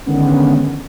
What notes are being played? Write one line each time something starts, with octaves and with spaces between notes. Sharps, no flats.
D3 D#3 G#3 B3 C#4